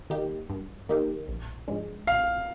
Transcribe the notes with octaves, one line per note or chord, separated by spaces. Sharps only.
D#3 A#3 D#4 G4
G2
D#3 A#3 D#4 G4
A#1
G#2 F3 G#3 D4
A#1 F5